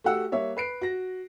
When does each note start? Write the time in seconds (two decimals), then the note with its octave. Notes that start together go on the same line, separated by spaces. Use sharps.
0.04 A3 F#4 G4 F#5 E6
0.32 G3 A#3 C#5 E5
0.57 B4 C7 D7
0.81 F#4 A#6